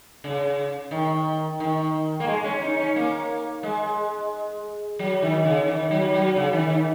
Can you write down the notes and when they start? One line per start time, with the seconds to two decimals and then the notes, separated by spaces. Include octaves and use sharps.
0.24 C#3
0.91 D#3
1.60 D#3
2.20 A#3
2.27 G#3
2.44 C#4
2.61 D#4
2.79 C#4
2.96 A#3
3.63 G#3
4.99 F#3
5.22 D#3
5.45 C#3
5.68 D#3
5.91 F#3
6.14 F#3
6.36 C#3
6.53 D#3
6.70 D#3